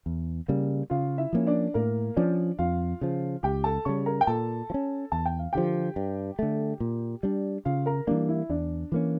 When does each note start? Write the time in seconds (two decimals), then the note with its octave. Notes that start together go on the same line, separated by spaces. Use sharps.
0.06 E2
0.48 C#3 G3 A#3
0.90 C#3 F4 F5
1.18 E4 E5
1.33 F3 A#3 C#4
1.47 D4 D5
1.74 A2 A#3 A#4
2.16 F3 C#4 D4 D5
2.58 F2 F4 F5
3.01 C#3 F3
3.43 C#2 G4 G5
3.64 A4 A5
3.85 C#3 G3 C#5 C#6
4.06 A#4 A#5
4.21 G5
4.27 A#2 A4 A5
4.70 F3
4.74 C#4
5.12 E2 A5
5.26 G5
5.39 F5
5.53 D3 F3 G4 G5
5.96 G2
6.39 D3 A3
6.80 A#2
7.23 G3 D4
7.65 C#3 F4 F5
7.86 A#4 A#5
8.07 E3 G3 A#3 D4 D5
8.29 E4
8.49 E2 D4 D5
8.92 E3 A#3 C#4